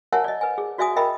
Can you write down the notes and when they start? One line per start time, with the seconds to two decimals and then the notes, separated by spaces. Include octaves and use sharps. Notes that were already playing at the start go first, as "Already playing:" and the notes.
0.12 A#4 C#5 E5 F#5 G#5 A5
0.24 D5 D#5
0.41 B4 G#5
0.58 G#4
0.78 F#4 D5 E5 G#5 D#6
0.96 A#4 D#5 E5 G5 A#5 B5